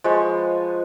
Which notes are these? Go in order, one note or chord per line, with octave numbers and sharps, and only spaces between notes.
F3 G#3 B4 C#6